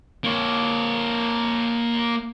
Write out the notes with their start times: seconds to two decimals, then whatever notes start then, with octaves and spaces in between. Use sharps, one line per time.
0.24 A#3 C#5